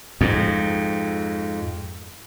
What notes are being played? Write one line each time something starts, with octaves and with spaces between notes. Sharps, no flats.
F2 G#2